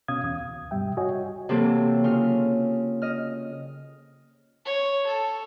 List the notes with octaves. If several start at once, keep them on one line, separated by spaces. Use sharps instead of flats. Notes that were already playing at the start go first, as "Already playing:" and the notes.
D2 B2 C#4 F5 D#6 G#6
E2 D#6
D2
G2 B2 G3 E5 G5
F#4 C#5 D#5 G#5
C3 E3 F#3 A#3 C4 A4
C#3 F4 F6
D#5 F6
C#5
A4